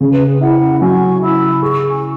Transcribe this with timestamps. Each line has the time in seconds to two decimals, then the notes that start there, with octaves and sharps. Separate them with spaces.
0.01 C#3 G#4
0.13 B4
0.25 G#4
0.41 E4 F#5 B5
0.73 B5
0.81 F#3 G#5 C#6
1.21 E4 B5 E6
1.62 G#4 C#6
1.74 E6
1.87 G#5 C#6